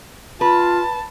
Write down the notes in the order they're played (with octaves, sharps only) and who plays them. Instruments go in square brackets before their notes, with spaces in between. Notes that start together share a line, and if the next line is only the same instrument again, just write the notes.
[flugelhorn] F4 [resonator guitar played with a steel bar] B4 [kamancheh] A5